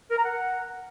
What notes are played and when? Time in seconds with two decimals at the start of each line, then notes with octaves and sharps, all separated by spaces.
0.11 A#4
0.18 A#5
0.24 F#5